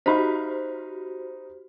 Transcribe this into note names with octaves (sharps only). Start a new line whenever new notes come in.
D#4 F#4 G4 C5 B5